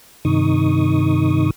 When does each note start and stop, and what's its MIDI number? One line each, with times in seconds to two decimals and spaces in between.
0.25 1.50 43
0.25 1.50 48
0.25 1.50 51
0.25 1.50 63
0.25 1.50 85
0.25 1.50 87